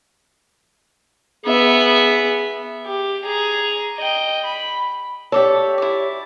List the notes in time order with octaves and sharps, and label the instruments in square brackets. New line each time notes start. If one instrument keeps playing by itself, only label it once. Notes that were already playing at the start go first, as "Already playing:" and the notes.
[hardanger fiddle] B3 E5 [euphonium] G#4
[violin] G4
G#4 A#5
D#5 G5
B5
[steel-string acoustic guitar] G4 C#5 [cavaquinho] A4 D5 E5
[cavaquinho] E4 D5